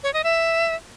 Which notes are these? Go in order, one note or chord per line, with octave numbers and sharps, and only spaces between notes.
C#5
D#5
E5